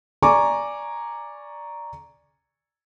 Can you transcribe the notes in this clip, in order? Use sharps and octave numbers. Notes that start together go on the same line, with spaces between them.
D5 G#5 A#5 C#6 D6